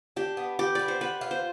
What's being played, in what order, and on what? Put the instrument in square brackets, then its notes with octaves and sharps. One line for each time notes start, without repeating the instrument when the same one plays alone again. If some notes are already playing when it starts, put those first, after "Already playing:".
[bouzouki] D4 [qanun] G4
[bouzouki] B3
[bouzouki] B3 [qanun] G4
[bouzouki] B3 [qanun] D5
[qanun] C5
[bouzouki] B3 [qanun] B4
[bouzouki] F4
[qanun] C5